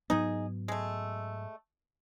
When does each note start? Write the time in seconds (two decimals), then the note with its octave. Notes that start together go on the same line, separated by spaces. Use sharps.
0.10 G#2 F#3 B3 D#4 G#4
0.68 G#3 A3